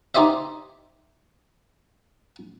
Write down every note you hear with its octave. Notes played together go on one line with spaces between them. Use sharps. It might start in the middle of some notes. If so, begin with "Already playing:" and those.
D#4 G4 C5 D#5 E5